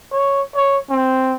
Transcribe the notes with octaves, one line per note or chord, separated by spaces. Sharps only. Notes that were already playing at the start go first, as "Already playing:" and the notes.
C#5
C#5
C4